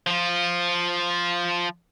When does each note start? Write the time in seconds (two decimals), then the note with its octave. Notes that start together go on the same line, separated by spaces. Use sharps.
0.07 F3 F4